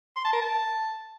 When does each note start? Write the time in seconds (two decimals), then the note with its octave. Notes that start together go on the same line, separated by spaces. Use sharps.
0.16 C6
0.25 A5
0.33 A#4
0.41 A5